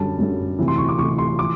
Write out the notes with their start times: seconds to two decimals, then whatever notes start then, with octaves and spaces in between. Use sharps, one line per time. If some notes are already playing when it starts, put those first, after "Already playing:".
Already playing: F#2 D3 G3 A5
0.18 F#2 D3 G3
0.58 D2 C3 E3
0.68 C6
0.78 C#6
0.89 D6
0.98 D2 C3 E3 C#6
1.18 C6
1.39 E3 D6